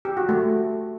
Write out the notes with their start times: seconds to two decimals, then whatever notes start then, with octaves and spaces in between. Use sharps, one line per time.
0.05 G4
0.17 F#4
0.29 A3